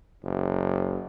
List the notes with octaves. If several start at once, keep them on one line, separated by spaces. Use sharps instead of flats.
F#1